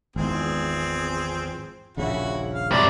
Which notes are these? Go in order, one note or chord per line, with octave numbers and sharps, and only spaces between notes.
G#1 E2 F3 C4 G#4
D#1 A#1 C#3 E4 F#4
F5
C#2 F#2 A2 C3 E4 D5